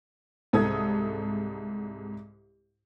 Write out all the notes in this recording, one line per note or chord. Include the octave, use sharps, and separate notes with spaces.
C2 G#2 A4 D#6 G#6